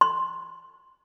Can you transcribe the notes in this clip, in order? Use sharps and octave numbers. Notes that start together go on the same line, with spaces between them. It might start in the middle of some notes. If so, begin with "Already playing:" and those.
C6